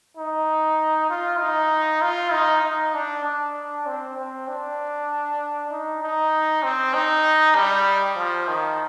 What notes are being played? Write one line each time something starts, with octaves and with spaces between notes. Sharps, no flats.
D#4
F4
D#4
F4
D#4
D#4
D4
D4
C4
C4
D4
D#4
D#4
C4
D#4
G3
F3
D#3